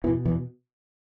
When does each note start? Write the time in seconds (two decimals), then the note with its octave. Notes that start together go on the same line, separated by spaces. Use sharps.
0.04 E2 B2 E3
0.25 E2 E3